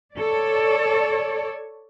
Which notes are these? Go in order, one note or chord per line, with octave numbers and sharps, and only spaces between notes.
A4 C#5 D5